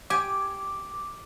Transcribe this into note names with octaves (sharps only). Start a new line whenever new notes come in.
G4 G#5 D6